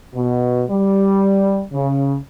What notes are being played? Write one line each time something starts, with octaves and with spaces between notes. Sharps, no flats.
B2
G3
C#3